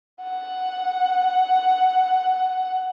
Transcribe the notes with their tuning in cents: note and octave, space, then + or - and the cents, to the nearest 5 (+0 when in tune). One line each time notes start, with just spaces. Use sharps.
F#5 +5